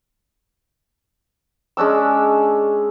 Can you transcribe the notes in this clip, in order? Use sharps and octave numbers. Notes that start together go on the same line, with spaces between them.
G#3 C#4 D4 E6